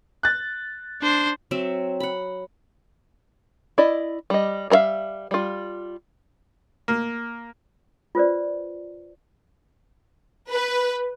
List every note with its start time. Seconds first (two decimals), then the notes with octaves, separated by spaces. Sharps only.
0.23 F#6 A6
1.02 D4 C5
1.51 F#3 C4 E5
2.00 F#5 B5
3.78 E4 D5 D#5
4.30 G3 D#5
4.70 G3 A#4 C5 E5 F5
5.31 G3 F4
6.88 A#3
8.15 F4 B4 C5 D5
10.48 B4